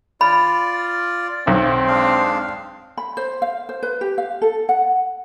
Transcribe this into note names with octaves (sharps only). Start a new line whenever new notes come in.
F4 D5 B5
B1 C4
G#3 D4 F5
B5
C5
F5
C5
B4
G4
F5
A4
F#5